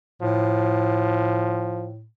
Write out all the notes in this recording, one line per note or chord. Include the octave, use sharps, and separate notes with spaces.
A2 F3